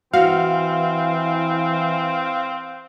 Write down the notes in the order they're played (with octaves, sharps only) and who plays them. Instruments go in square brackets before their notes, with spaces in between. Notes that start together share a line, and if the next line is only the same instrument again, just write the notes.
[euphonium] E3 [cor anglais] C4 [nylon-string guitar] F#4 [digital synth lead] F5